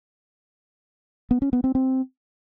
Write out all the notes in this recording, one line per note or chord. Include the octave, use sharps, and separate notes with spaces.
B3
C#4
B3
C4
C4